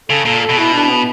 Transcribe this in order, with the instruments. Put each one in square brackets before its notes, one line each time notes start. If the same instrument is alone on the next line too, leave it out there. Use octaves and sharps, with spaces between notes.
[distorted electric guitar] C#3 [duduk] A4
[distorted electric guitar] A#2 [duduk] A4
[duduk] A4
[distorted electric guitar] B2
[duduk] E4
D4
B3